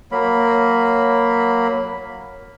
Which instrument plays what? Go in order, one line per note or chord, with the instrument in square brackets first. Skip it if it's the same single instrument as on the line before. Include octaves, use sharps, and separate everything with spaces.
[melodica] F#3 A#3 B5